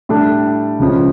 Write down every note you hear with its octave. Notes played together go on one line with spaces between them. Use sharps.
A2 G3 D4 A4
C#2 C#3 F3 C#4